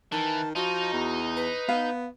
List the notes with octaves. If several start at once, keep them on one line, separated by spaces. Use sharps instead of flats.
D#3 E3 A5
F3 D#4 F#4
E2
B4
B3 F5